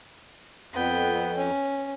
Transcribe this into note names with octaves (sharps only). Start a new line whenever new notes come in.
F2 B3 G5
C#4